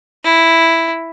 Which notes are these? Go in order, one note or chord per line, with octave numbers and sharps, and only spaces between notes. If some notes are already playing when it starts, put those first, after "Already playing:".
E4